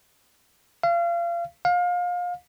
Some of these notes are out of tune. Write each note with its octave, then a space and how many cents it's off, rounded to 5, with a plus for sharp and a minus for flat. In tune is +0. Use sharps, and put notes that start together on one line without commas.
F5 -30
F5 +30